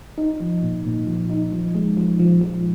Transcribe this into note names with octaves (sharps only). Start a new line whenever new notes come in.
D#4
F3
A#2
A#2
F3
D#4
F3
G#3
F3
F3
F3